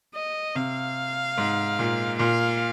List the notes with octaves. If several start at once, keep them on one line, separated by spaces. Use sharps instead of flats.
D#5
C3 F5
G#2
A#2
A#2 F5